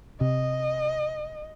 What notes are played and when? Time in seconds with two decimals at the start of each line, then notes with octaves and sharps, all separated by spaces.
0.21 C3 D#5